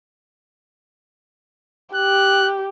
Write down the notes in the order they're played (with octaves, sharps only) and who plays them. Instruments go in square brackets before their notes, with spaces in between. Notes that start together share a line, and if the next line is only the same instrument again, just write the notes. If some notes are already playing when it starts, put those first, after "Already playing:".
[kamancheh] G4 [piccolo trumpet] F#6